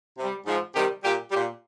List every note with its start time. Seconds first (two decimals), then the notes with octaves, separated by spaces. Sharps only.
0.18 C3 G3
0.45 G#2 F3
0.74 C3 D#3 G3 G4
1.02 A#2 G3 G4
1.31 G3 G4
1.35 A#2